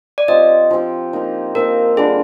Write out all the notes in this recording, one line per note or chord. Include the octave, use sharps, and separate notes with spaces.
D5
F3 C4 G4 D#5
F3 C4 G4
F3 A#3 D#4
F3 A#3 D#4 A#4
D3 G3 D4 F4 G#4